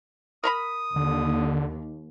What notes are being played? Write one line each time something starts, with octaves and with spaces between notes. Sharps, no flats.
A#4 A#5 B5 D#6
D#2 D3